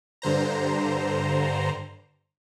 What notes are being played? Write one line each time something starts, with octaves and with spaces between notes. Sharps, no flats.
G2 D3 C5 A#5